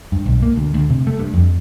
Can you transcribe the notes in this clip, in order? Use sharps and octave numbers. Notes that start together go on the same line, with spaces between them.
G2
B1
A#3
D2
D2
C3
A3
G2
F2